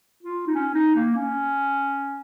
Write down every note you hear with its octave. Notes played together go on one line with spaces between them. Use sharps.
F4
D#4
C#4
D#4
A#3
C#4